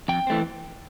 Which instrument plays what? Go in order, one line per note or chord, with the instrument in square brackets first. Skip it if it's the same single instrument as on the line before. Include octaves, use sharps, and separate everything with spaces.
[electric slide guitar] F2 G5
E3 A3 C4